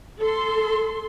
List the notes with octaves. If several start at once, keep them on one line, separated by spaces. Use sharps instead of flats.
A4 C6